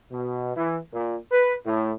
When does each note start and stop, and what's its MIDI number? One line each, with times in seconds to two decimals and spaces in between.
0.12 0.53 47
0.57 0.79 52
0.94 1.17 46
1.32 1.55 71
1.66 1.93 45